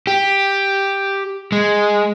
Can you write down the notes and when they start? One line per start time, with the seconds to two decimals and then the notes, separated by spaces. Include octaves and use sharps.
0.07 G4
1.52 G#3